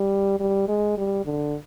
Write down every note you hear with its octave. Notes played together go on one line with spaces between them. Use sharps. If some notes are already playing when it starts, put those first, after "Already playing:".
Already playing: G3
G3
G#3
G3
D3